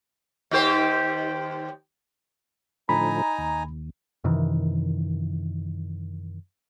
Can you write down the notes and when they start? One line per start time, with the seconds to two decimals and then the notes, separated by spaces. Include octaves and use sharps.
0.51 D#2 G4 C5
2.89 A2 D3 F3 D#4 G#5 A#5 B5
3.38 D#2
4.24 F#2 C3 D#3 E3